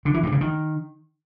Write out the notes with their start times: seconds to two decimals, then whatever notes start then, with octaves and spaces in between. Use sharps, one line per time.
0.05 D3
0.14 E3
0.23 G2
0.32 C#3
0.41 D#3